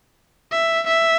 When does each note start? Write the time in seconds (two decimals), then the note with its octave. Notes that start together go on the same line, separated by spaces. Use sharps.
0.52 E5
0.88 E5